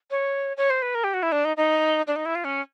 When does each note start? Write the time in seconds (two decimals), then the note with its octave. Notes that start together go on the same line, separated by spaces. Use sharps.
0.11 C#5
0.57 C#5
0.70 C5
0.82 B4
0.95 A#4
1.04 G4
1.14 F#4
1.23 E4
1.32 D4
1.45 D#4
1.57 D#4
2.07 D4
2.16 D#4
2.26 E4
2.35 F4
2.44 C#4